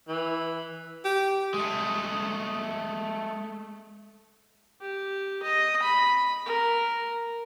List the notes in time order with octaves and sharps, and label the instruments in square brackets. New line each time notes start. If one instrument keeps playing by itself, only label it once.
[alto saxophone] E3
[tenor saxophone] G4
[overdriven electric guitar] G#3 A3
[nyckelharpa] G4
D#5
B5
A#4